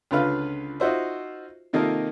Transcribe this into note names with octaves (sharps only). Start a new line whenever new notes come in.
C#2 D3 F4 B4 F5
D#4 F4 F#4 C5 E5
C3 D#3 A#3 D#4 F4 A4